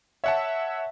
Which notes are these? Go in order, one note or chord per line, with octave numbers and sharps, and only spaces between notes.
C#5 E5 F#5 A5